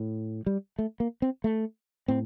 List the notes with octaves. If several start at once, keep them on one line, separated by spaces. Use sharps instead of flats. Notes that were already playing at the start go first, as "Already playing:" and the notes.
Already playing: A2
G3
A3
A#3
C4
A3
A2 C4